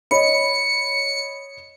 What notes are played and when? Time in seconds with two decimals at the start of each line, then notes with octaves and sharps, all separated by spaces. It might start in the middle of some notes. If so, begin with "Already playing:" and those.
0.11 C#5 D#5 B5 C#7